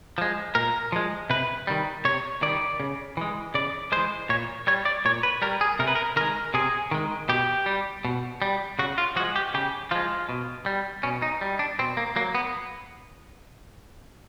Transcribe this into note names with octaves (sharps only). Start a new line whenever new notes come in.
F3 G#3
A#2 A#4
F3 G#3
C3 B4
D#3 G3
C3 C#5
D#3 G3 D5
C#3
E3 G#3
C#3 D5
E3 G#3 C5
A#2 C#5
G3 C#5
D5
A#2 C#5
B4
G3 A#4
G#4
C3 A#4
B4
A#4
D#3 G#3 A#4
C3 G#4
D#3 G#3
B2 G4
G3
B2
G3
C#3 F#4
F4
F3 G#3 F#4
G4
C#3 G4
F3 G#3 F4
B2
G3
B2 C#4
D#4
G3
D4
B2 C4
A#3
F#3 A#3
B3